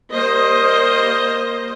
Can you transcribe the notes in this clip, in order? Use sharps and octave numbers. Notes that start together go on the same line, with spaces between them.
G3 A#3 C5 D#5